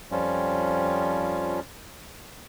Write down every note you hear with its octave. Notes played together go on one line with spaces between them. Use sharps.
F2 F3 G3 C#4 F4